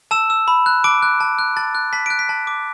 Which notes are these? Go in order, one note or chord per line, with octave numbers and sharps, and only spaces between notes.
A5 E6 E7
E6
B5
F#6
A5 D6 D7
F#6
A5
F#6
A5 A6
F#6
A5 B6
F#6 D7
B6
A5
D6